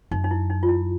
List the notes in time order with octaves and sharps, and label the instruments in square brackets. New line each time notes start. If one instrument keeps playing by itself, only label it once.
[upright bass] F#2 [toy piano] D#4
[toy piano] D#4
E4
D#4
F4
E4